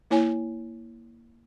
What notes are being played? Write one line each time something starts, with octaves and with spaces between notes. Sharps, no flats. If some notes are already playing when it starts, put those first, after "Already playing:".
A#3 E4 C#5 G#5